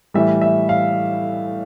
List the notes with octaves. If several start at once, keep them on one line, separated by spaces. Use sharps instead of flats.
A2 E3 G3 E5
E5
F5